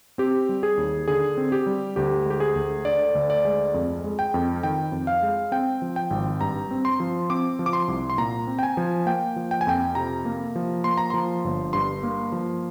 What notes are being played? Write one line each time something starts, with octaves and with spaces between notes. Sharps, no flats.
C4 G4
G3
G#4
D#2
D3 G#4
C4
G4
G3
D2 G4
G#3 G4
G#4
D2
D3 D5
D2
D5
G#3
F2
G#3
G5
F2
D#3 G5
F2
F5
G#3
C4 G5
F3
G5
G#1
G2 A#5
C4
C6
F3
C4 D6
F3
D6
C6
C2
C6
A#2 A#5
C4
G5
G#5
F3
A#3 G5
F3
G5
G#5
F2 G5
C3 A#5
A#3
F3
A#3 C6
A#5
F3 C6
G1
G2 C6
A#3
F3